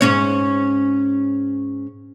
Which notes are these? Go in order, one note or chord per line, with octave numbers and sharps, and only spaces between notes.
G#2 C#4 C#5